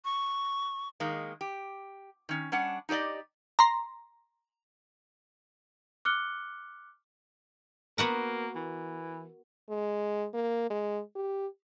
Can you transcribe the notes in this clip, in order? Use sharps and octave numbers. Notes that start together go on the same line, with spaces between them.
C#6
D#3 G#3 A#3
G4
D#3 C#4
G3 C#4 D4 F#5
D#4 G4 C5 D5 D#5
A#5 C6
D6 F6 F#6 C#7 G7
A#3 B3 F#4 A#4
E3
G#3
A#3
G#3
G4